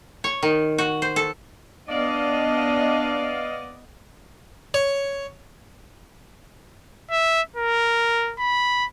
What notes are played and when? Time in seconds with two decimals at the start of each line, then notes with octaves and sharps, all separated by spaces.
0.24 C#5
0.43 D#3
0.78 F#4
1.02 C5
1.16 A4
1.89 B3 D4 D5 D#5 F5
4.74 C#5
7.11 E5
7.56 A#4
8.40 B5